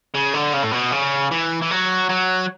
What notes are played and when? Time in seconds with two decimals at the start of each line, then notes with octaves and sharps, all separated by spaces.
0.14 C#3
0.34 D3
0.54 C#3
0.64 A2
0.72 B2
0.92 C#3
1.31 E3
1.62 E3
1.71 F#3
2.10 F#3